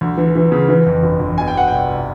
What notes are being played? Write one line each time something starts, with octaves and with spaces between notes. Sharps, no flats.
D2
E3
E3
C#3
E3
F2
G1
G1
B2 G#5
G5
B2 F#5
C2 G5
C2